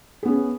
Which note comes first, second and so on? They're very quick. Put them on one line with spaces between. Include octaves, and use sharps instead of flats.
G#4 B3 C#4